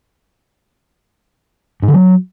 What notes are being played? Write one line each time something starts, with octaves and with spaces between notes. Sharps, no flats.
G#2
D3
F#3